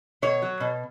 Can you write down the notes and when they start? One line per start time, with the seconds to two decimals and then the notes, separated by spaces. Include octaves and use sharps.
0.22 B2 C#5
0.42 F#3
0.60 B2